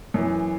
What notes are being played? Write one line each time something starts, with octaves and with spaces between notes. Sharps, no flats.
F#2 E3